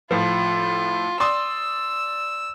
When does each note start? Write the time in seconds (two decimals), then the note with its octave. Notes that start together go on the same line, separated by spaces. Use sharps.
0.11 A2 F3 F4
1.20 D5 C6 D#6 E6